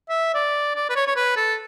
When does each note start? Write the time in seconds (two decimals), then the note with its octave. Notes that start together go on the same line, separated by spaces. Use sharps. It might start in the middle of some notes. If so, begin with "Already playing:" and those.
0.09 E5
0.35 D5
0.75 D5
0.90 B4
0.96 C#5
1.07 C#5
1.16 B4
1.36 A4